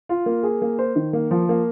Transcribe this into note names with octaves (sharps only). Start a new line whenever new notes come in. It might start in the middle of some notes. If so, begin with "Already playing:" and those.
F4
A#3
G#4
A#3
C5
D#3
A#3
F3
A#3